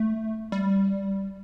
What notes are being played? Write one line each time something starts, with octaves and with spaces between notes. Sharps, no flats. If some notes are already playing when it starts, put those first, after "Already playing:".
Already playing: A3
G3